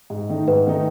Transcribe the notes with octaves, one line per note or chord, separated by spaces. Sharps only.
G#2
D#3 A3 D#4
G#2 B4
D#3 A3 D#4